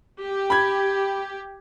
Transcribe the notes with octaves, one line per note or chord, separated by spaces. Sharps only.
G4
B5 G#6